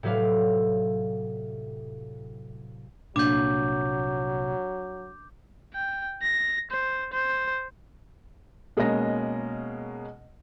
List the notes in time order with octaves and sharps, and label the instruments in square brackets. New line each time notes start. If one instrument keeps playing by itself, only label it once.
[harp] A2 C3 F#3 B4 D5 F5
[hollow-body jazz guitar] C2 A#2 [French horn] F#3 [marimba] D4 [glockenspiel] D6 G6
[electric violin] G5
A#6
C5
C5
[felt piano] B2 G#3 A#3 C#4 D#5 A#6